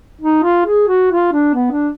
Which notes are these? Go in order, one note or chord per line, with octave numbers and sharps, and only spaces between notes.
D#4
F4
G#4
F#4
F4
D4
B3
D4